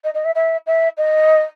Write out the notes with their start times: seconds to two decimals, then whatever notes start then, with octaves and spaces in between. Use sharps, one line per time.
0.04 D#5
0.14 D#5
0.24 E5
0.35 E5
0.66 E5
0.97 D#5